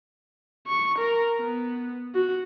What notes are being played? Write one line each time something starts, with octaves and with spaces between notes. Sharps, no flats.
C#6
A#4
B3
F#4